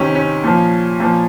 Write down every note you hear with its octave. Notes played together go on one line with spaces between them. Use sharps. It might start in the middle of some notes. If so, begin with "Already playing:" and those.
Already playing: C3 D#3 C#4
C#4
A#2 F3
A#2 F3